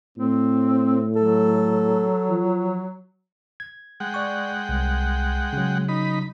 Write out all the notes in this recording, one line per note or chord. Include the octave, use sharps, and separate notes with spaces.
A2 C4
F#3 A4
F3
G#6
G#3 F#5 G5
D5 C#6
C2
C#3 F#3
D#4 B5